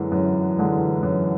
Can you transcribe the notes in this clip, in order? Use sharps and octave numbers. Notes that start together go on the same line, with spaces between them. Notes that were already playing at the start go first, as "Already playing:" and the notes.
Already playing: F#2 D3 E3 G#3
F#2
D3 G#3
F#2